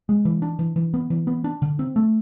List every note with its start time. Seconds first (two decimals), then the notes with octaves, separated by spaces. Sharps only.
0.09 G#3
0.25 E3
0.42 D4
0.59 E3
0.76 E3
0.94 B3
1.10 E3
1.27 B3
1.44 D4
1.62 D3
1.79 C4
1.96 A3